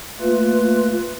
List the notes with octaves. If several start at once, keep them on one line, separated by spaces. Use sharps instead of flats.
A3 A#3 F4 B4